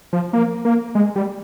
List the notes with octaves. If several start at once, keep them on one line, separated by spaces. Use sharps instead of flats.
F3
A#3
A#3
G#3
G3